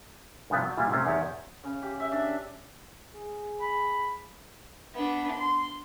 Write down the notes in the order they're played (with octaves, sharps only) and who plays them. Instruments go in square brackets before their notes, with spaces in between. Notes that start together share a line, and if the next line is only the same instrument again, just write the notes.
[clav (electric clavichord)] G2 C3 F3 B3
F#3
A#2 G3 E4 F4 G4
C3 A3 C#4 C5
E2 D#3 G4 C#5 A5
[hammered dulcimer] C#3
G4
E5
D4
[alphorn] G#4
[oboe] B5
[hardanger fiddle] B3 D4
C6